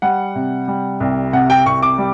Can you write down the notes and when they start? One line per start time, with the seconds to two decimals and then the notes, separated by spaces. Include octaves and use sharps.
0.02 G3 F#5
0.35 C3
0.68 G3
1.00 C2
1.33 C3 F#5
1.50 G5
1.66 C2 C#6
1.82 D6
1.98 G3